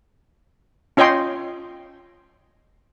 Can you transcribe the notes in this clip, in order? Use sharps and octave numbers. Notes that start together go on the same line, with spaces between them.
C#4 F4 C#5 D#5 G5 C6